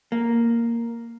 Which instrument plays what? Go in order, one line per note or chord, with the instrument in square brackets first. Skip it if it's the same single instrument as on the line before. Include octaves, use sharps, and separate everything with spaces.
[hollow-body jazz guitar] A#3